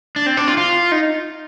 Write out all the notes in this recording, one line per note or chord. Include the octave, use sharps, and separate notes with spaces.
D4
C4
D4
F4
F4
D#4